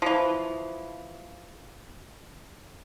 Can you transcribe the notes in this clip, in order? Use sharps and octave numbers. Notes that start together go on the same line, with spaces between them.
E3 F3